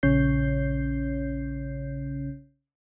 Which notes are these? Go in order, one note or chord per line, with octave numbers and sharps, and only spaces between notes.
A#1 C#3 C#4 C#5 G6 C7